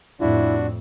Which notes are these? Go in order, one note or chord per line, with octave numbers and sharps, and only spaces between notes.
F2 A2 D4 E4 F#4